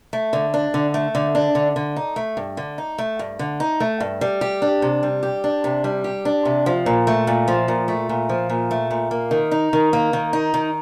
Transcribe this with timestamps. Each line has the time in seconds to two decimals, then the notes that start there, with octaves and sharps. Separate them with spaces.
0.13 A3
0.33 D3
0.54 D4
0.74 D3
0.94 A3
1.15 D3
1.35 D4
1.55 D3
1.76 D3
1.96 D#4
2.16 A3
2.37 G2
2.57 D3
2.78 D#4
2.98 A3
3.19 G2
3.39 D3
3.60 D#4
3.80 A3
4.00 G2
4.21 G3
4.41 G4
4.62 D4
4.82 C3
5.03 G3
5.23 G4
5.44 D4
5.64 C3
5.84 G3
6.04 G4
6.25 D4
6.45 C3
6.66 F3
6.86 A#2
7.07 A3
7.27 A#2
7.48 F3
7.68 A#2
7.88 A3
8.09 A#2
8.29 F3
8.49 A#2
8.71 A3
8.91 A#2
9.11 A#3
9.31 D#3
9.51 D#4
9.73 D#3
9.93 A#3
10.13 D#3
10.33 D#4
10.54 D#3